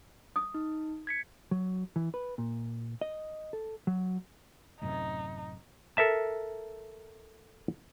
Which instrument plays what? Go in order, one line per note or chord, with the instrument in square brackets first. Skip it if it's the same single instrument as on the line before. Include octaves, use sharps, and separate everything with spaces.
[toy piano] D#6
[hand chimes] D#4
G#6 B6 C#7
[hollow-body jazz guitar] F#3
E3
B4
A#2
D#5
A4
F#3
[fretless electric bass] A1 F#2 C3 [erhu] D#4
[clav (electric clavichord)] A4 A#4 E5 A5